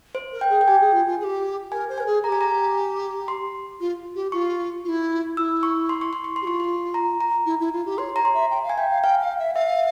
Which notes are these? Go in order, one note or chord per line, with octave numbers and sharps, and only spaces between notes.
C5
A#4
G5
G#4
G5
G4 G#5
G#4
F4
F4
G#4
G4
A#4 G#5
C5
A#4 G#5
G#4
G#4 A#5
G4 G#5
A#5
C6
F4
G4
F4 C#6
F4
E4
E4 F4 E6
C#6
C6
C#6
C6
C#6
C6
G4
F4 C#6
C6
A#5
A#5
E4
E4
F4
G4
C#5 C6
C#5 A#5
C6
E5
G5
F5
G#5
E5 G5
F5
F5 G5
F5
E5
E5 F5